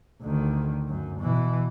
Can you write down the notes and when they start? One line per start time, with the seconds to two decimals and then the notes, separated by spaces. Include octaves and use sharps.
0.21 D2 D#3
0.88 F#2
1.20 B2 E3